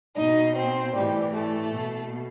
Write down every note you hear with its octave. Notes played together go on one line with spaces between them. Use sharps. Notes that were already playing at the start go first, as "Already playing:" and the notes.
B2 D#4 D#5
C4 C5
A2 E3 G3 G4
A3 A4
B2